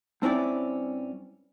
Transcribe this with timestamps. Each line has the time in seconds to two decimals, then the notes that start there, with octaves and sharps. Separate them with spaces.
0.22 G2 C4 C#4 E4 D5